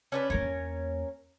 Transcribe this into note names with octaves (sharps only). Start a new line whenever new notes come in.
C#4 D4 B4
E2 A#3 C#4 A#4